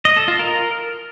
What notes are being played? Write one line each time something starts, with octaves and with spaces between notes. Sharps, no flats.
D#5
A4
F4
A#4